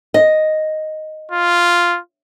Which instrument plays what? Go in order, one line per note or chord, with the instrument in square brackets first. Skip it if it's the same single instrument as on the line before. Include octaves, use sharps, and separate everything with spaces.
[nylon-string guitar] D#5
[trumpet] F4